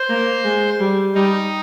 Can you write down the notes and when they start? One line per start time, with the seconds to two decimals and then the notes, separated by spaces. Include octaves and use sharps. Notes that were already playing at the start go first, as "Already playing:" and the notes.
Already playing: C5
0.09 A#3
0.44 G#3
0.80 G3
1.15 G3 D#4